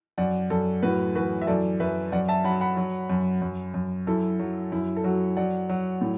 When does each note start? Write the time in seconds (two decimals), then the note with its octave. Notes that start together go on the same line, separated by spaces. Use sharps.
0.18 F#2 D5 F#5
0.50 F#2 A4 D5
0.82 A2 F#4 B4
1.15 E3 F#4 B4
1.42 E5
1.47 F#2 A4 D5
1.80 F#2 B4 E5
2.12 F#2 D5 F#5
2.28 E5 A5
2.44 F#3 F#5 B5
2.61 F#5 B5
2.77 F#3
3.09 F#2
3.42 F#2
3.74 F#2
4.07 F#2 E4 A4
4.40 F#3
4.72 F#2 E4
4.96 A4
5.04 F#3 F#4
5.36 F#3 D5 F#5
5.70 F#3
6.01 A2